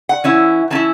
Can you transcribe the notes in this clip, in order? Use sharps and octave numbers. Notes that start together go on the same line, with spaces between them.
F#5
E3 C#4 E4
E3 C#4 E4 A5